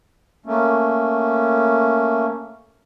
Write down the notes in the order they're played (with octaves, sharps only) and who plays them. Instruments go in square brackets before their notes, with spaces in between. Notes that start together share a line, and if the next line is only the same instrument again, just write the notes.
[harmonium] A3 A#3 C#4